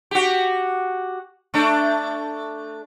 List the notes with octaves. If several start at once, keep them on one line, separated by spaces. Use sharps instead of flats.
F#4 G4
A3 D4